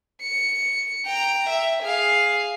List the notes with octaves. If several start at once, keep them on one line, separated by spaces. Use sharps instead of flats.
C#7
G5 A#5
E5
G#4 F5